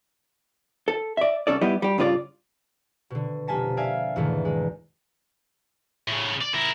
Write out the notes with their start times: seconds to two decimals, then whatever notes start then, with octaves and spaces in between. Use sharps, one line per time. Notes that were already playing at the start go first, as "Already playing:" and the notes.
0.88 A4
1.17 D5 E5
1.47 C2 C#4 A4 D5
1.61 G3 B3 E4 G4 D#5
1.82 G3 G4
1.98 G2 C#3 F4 B4 D5
3.10 B2 D3
3.48 F1 A#3 G#5 A5 B6
3.77 D5 E5 F5 G#5 G#6
4.16 E2 G#2 B2 D3 D#3 A3
4.45 G#3
6.08 A2 C#3
6.41 D5
6.54 E4 A#4